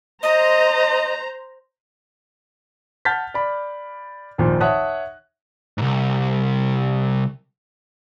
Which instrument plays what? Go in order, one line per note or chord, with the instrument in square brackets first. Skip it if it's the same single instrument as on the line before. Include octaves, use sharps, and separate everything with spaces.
[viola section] C5 A#5 [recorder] D#5
[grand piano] F#5 A5 F6 G6 A6 B6
D5 B5
G#1 D#2 A#2 F3 C5
C#5 E5 F#5 A5 D#6 F#6
[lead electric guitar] C2 G#2